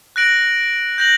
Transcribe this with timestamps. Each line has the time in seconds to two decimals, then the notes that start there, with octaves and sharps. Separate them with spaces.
0.16 F#6 A#6 D7 F#7
0.98 G6 A#6 F#7